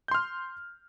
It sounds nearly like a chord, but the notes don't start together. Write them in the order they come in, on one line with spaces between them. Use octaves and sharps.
G6 C6 F6